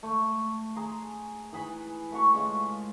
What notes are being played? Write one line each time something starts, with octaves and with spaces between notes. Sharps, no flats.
A3
G#4 A#5 C6
E3 G#4 B5
A3 F#4 C#6
C#3 G#3 F4